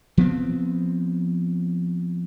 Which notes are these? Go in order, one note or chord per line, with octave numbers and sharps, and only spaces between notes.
F3 B3 C4